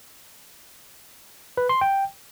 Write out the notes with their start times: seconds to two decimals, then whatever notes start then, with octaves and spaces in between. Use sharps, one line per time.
1.57 B4
1.69 C6
1.81 G5